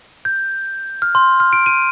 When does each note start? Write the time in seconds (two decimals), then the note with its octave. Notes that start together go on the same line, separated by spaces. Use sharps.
0.25 G6
1.02 F6
1.15 C6
1.40 F6
1.53 D7
1.66 D#7